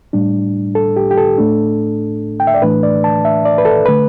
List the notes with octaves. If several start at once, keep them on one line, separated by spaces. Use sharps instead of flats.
A2 G3 D4
A4
G4
G4
A4
A2 A3 D4
G5
E5
D5
A2 E3 A3 D4 B4
D5
A5
E5
D5
B4
A4
D3 A3 B4